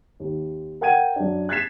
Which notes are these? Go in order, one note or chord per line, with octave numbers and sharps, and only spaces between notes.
D#2
A#4 F#5 G5 G#6 D#7
F#2 D4
F#6 G#6 A6 B6 C7 E7